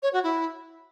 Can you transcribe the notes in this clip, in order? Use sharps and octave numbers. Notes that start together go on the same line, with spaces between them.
C#5
F#4
E4